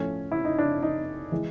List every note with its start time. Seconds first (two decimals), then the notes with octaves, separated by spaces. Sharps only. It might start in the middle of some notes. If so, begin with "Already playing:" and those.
Already playing: A2 F3 A3 C#4
0.32 E4
0.45 D#4
0.58 D4
0.82 D#4
1.32 E3 G#3